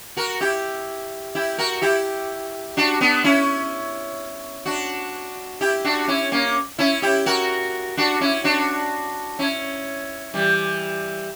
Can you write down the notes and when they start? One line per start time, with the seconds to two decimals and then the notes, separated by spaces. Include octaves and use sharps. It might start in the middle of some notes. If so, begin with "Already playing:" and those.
0.17 F#4 A#4
0.41 E4 G4
1.35 E4 G4
1.58 F#4 A#4
1.82 E4 G4
2.77 D4 F#4
3.01 B3 D4
3.24 C#4 E4
4.66 D4 F#4
5.61 E4 G4
5.84 D4 F#4
6.08 C#4 E4
6.32 A#3 C#4
6.79 C#4 E4
7.02 E4 G4
7.26 F#4 A#4
7.97 D4 F#4
8.21 C#4 E4
8.44 D4 F#4
9.39 C#4 E4
10.34 E3 G3